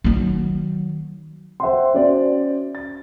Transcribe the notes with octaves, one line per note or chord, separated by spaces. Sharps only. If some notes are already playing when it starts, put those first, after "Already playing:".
D#3 F#3
C5 E5 F#5 G5 C6
C#4 F#4 C5 D5
A6